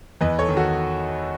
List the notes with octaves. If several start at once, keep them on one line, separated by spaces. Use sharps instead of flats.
E2 B4 D#5
A4 C#5
D#3
F#4 A4